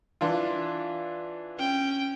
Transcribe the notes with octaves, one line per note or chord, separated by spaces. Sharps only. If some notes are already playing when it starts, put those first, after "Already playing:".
E3 D4 F4
C#4 G5